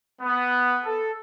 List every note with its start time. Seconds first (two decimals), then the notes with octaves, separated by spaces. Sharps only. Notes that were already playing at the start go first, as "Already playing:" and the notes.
0.21 B3
0.84 A4